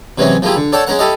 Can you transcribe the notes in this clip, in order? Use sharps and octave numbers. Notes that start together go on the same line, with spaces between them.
C3 E3 F#3 G#3 C4 C#4
F3 G#3 A#3 E4 F4 G4
D3
A4 C#5 D5 F#5 G5 A5
G#3 C#4 A#4 F#5
E4 G4 A4 D#5 F5